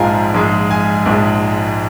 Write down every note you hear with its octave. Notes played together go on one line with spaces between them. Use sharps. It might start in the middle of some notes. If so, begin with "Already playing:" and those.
Already playing: A#1 G#2 F3 G#3 F5 G#5 A#5
A#1 G#2 G#3
G#5
A#1 G#2 F3 G#3